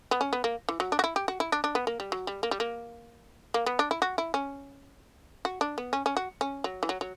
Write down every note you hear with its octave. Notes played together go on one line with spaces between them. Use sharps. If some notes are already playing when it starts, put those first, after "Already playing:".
B3
C#4
B3
A#3
E3
F#3
D4
F#4
E4
G4
F#4
E4
D4
D4
B3
A#3
G3
F#3
G3
A#3
G3
A#3
A#3
B3
D4
E4
F#4
E4
C#4
F#4
D4
B3
C#4
C#4
F#4
C#4
F#3
E3
F#3
F#3